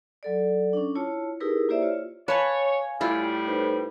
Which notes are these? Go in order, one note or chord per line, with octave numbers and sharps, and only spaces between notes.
F#3 A4 D5
C#4 D4
E4 F4 C#5 A5
D#4 E4 G4 G#4 A#4 B4
A#3 E4 G4 C5 D5 E5
F4 C#5
B4 C#5 F5 G#5 A5
A2 G3 E4 F4
D#4 B4 C5